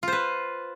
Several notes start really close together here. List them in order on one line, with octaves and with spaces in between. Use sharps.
F4 C5 B4